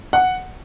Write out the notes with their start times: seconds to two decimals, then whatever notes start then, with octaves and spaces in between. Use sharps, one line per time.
0.13 F#5